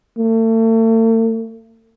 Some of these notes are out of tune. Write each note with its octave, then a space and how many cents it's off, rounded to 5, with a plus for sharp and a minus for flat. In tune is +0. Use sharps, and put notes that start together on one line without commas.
A3 +40